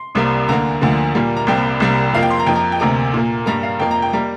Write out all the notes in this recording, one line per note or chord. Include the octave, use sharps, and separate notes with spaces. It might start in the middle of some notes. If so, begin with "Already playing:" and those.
Already playing: C6
C2 C3 G3 A#3
D2 D3 A#3 A#5
D2 D3 F3 A#3
A#2 G3 A#3
A#5
C2 C3 G3 A#3 G5
C2 C3 G3 A#3
F2 F3 A#3 F5
G5
C6
A#5
F2 F3 A#3 G5
A#5
G5
D2 C3 A#3 A#5
A#2 A#3
G2 G3 A#3 A#5
F5
F2 F3 A#3 G5
A#5
G5
G3 A#3 A#5